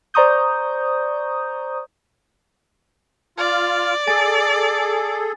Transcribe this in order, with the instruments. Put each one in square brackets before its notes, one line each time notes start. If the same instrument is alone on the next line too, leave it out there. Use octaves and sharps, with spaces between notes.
[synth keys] C5 D5 A#5 C#6 D#6 G6
[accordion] F4 F6 [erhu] D5
[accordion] G#4 A4 [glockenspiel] G#5 A6